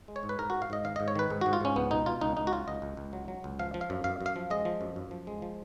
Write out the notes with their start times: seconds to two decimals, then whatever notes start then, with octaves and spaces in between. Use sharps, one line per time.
0.08 G#3
0.16 C#5
0.23 G#2
0.29 B4
0.39 G#2 A#4
0.50 G#2 F#4
0.62 F5
0.70 G#2 D#5
0.84 D#3 F5
0.96 G#2 D#5
1.08 C#5
1.15 D#3 B4
1.30 G#2
1.41 G#2 F#4
1.53 F4
1.61 G#2 C#4
1.76 C#2 B3
1.91 B2 D#4
2.06 B2 F4
2.21 C#2 D#4
2.37 C#2 D#4
2.47 F#4
2.52 F#3 F4
2.68 C#2 D#5
2.82 C#2
2.97 C#2
3.13 F#3
3.28 F#3
3.44 C#2
3.59 F3 F5
3.74 F3
3.81 F5
3.90 F#2
4.04 F#2 F5
4.21 F#2
4.26 F5
4.36 F3
4.50 G#3 D#5
4.65 F3
4.81 F#2
4.96 F#2
5.11 F3
5.27 G#3
5.42 F3